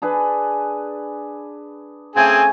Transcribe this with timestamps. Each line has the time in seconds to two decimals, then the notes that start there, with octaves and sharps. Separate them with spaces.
0.02 D4 G#4 B4
2.16 C#3 A3 C4 G#4 G#5